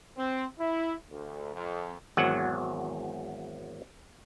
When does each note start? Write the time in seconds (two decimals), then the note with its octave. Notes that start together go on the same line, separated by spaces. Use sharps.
0.16 C4
0.59 E4
1.09 D2
1.54 F2
2.17 G#1 E2 F#3 F#5